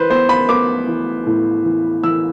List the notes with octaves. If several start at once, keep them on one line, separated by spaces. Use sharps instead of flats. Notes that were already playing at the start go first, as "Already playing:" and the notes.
Already playing: E3 B4 C5
B3 C5
B5
B3 D6
E3
A2
E3
E3 E6